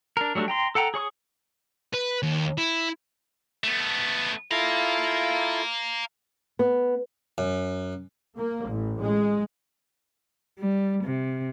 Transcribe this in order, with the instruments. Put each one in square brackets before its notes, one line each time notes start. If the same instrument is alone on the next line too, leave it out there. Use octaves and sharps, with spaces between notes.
[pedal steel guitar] D4 A#4
F#3 G3 A3 C4 D4
G5 A#5 C6
A4 F#5 G5 A#5
G#4 C#5 C#6 D#6
[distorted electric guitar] B4
D#2
E4
A3 B3
[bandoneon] E4 F4 A4 [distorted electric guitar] F5 A#5
[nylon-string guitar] B3
[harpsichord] F#2
[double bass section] A#3
A1
G#3
[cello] G3
C3